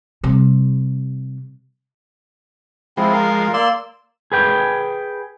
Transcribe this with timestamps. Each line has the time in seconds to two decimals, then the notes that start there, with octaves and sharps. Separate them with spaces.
0.24 C3 G3
2.97 F3 G#3 C4 E4
3.13 A#4 F5
3.54 A#3 D5 C6 E6
4.32 G#4 B4 G5